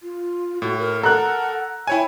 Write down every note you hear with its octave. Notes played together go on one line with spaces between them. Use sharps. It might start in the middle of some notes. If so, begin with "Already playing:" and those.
F4
A2 F#4
A#4
A4 A#4 F#5 A#5 F#6
E4 C#5 G5 G#5